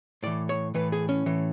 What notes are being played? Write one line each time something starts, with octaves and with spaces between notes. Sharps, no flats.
A2 E3 D5
C#5
A2 E3 B4
G#4
C#4
A2 E3